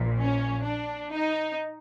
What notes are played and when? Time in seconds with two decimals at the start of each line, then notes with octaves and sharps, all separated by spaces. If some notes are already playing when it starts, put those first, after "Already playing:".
Already playing: A#1 A#2 F3
0.18 C#4
0.64 D4
1.11 D#4